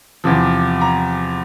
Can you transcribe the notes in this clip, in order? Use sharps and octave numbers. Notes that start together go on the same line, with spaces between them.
E2 C3 F3
A#5